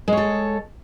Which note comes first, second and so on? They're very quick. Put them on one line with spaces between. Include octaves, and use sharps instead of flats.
G#3 C#5 A4